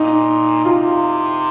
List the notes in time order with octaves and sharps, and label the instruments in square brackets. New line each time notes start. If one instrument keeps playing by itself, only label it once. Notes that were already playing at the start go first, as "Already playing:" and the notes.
Already playing: [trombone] A#2 [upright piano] D#4
[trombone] C3 [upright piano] F4